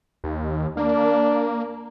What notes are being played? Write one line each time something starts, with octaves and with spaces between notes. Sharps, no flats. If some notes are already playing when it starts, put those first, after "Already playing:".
D#2
A#3 D4